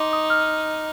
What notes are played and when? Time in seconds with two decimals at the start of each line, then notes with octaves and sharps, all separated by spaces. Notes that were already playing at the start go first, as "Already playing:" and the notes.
Already playing: D#4 C6 D6
0.13 D#6
0.30 F6